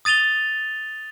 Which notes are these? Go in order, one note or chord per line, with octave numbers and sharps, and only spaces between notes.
D#6 A6 D#7 F7 G7